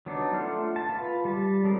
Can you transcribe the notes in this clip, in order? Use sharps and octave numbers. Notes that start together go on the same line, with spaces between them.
F#3 B3 D4 D#4
A3 F4 F#5 C6 F6
A5
F4 B4
G3 A5
F3 F#3 G#3 C4 A#4